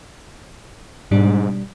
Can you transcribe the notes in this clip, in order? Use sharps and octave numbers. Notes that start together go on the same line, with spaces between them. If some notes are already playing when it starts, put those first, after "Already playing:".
G#2 B2 G3 D4